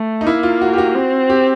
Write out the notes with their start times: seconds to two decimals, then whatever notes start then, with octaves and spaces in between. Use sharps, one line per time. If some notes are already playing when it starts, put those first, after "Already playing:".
Already playing: A3
0.21 D#4
0.26 A#3 E4
0.43 F4
0.62 F#4
0.73 G4
0.78 F#4
0.95 C4
1.30 G4